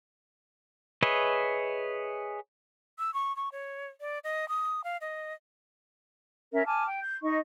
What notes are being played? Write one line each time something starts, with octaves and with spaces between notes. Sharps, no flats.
G#4 B4 C#5 D#5 E5
E6
C#6
C#6
C#5
D5
D#5
D#6
F5
D#5
C#4 A#4 E5
G#5 A5 D6 F6
G5
G6
D#4 D#5 C#6